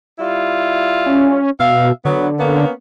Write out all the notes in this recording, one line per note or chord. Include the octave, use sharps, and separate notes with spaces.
G3 E4 F4
C#4
B2 E5 F5
D3 F#3 B3
A#3 B3 C#4